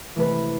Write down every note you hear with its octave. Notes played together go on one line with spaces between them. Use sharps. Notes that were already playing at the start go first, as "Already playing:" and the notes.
C3 E3 A3 B4